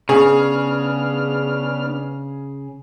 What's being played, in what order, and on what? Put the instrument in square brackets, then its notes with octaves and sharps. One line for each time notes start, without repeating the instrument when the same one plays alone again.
[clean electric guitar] C#3 [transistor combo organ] B3 D4 F6 [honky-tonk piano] G#4